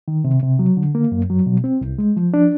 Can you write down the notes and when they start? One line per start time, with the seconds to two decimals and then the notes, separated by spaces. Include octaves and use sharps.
0.08 D#3
0.24 C3
0.43 C3
0.59 F#3
0.77 D3
0.95 A#3
1.12 F#2
1.30 F#3
1.46 B2
1.64 C4
1.81 C2
1.98 G#3
2.17 F3
2.34 D4